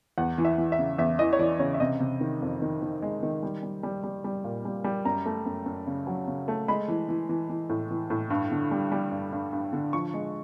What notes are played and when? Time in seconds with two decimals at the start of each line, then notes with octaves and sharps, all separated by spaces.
0.18 E2 F#5
0.38 E3
0.45 E5
0.58 E3
0.72 E5
0.79 C#3
0.98 E2 E5
1.19 E3 D#5
1.33 C#5
1.39 E3 D5
1.59 C#3 C#5
1.74 E5
1.80 C3 D#5
2.00 C3
2.21 D#3
2.41 F2
2.62 D#3
2.82 D#3
3.02 G#3
3.23 D#3
3.43 G3
3.63 G3
3.83 G3
4.04 G3
4.24 G3
4.44 A#2
4.65 G3
4.84 G3
5.05 F#2 A#5
5.26 A3
5.46 F#2
5.66 F#2
5.87 C#3
6.07 F#3
6.28 C#3
6.48 A3
6.68 G#3 B5
6.88 E3
7.09 E3
7.29 E3
7.49 E3
7.69 A2
7.90 E3
8.10 A2
8.30 G2
8.51 D3
8.71 G3
8.92 G3
9.11 G2
9.32 G2
9.52 G2
9.73 D3
9.93 F3 C#6
10.14 G#3